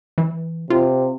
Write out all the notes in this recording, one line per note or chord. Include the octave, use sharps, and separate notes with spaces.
E3
C3 F4